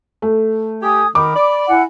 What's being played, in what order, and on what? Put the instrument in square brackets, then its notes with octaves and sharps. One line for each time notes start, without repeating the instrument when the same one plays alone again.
[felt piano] A3
[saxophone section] G4 [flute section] G#5 D#6 G#6
[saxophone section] D#3 [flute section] B5 [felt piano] D6
[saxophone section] D5
[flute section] E4 F#5 G#5